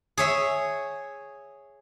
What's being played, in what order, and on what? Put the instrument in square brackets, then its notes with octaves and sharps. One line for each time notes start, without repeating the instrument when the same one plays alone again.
[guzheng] G#4 C#5 E5